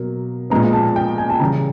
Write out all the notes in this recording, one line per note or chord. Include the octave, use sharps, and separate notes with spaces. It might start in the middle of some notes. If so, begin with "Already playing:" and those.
Already playing: B2 F#3 A#3
A#2 F3 G#3 B3 A#5
A5
G5
G#5
A5
C#3 E3 G3 A#5